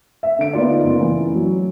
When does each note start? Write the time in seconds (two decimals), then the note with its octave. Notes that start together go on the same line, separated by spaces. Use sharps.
0.23 E5
0.38 D3 D7
0.53 B3 D#4 F4 D5
0.83 F#1
1.01 E3
1.35 F#3